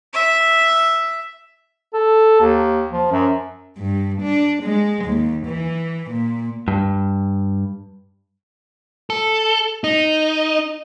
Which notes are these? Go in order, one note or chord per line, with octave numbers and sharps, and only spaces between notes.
E5
A4
D#2
F3
F#2
G2
D4
G#3
D#2
E3
A#2
G2
A4
D#4